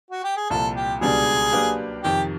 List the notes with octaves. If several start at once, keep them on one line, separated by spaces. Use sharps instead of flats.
F#4
G4
G#4
C2 A#2 F3 A4
G4
C#2 B2 G3 B3 D4 G#4
F#3 A#3 D4 G4 B4
F2 C3 D#3 G4